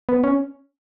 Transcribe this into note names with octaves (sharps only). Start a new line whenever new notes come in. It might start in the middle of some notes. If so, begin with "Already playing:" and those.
B3
C#4